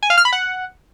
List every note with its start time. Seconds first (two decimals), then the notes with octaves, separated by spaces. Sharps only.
0.03 G#5
0.10 F5
0.18 F6
0.25 B5
0.33 F#5